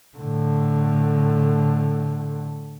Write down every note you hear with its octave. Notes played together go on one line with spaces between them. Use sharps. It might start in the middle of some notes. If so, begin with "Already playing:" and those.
A2 D3